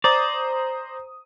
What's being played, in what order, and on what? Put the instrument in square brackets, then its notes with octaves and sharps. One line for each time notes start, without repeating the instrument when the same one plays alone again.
[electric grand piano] C5 A#5 D#6 [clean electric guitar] D5